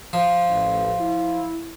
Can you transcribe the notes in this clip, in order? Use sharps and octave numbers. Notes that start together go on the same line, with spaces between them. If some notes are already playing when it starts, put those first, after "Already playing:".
F3
A1
E4